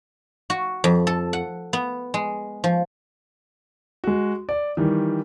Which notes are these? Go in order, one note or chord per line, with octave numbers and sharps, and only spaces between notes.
F#4
F2
A4
F#5
B3
G#3
F3
G#3 F#4
D5
D#3 E3 G3